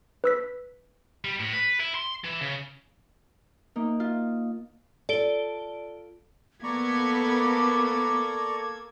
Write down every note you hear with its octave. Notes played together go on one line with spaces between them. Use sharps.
B4 E6 B6
G3
A2
B4
E4
C6
E3
C#3
A#3 D#4
F4
F4 A4 D5 D7 G7
A#3 B3 A4 D5 A#5 C#6 D6 G#6